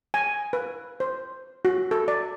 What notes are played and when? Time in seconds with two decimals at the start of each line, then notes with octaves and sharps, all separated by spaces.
0.14 G#5
0.53 B4
1.00 C5
1.65 F#4
1.91 A4
2.08 D5